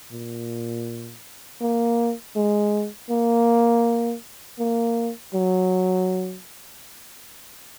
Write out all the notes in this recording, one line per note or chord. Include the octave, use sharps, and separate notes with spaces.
A#2
A#3
G#3
A#3
A#3
F#3